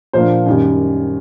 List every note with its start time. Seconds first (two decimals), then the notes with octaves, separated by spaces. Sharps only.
0.13 A#2 F3 A#3 D4 C5
0.46 F#2 D#3 G3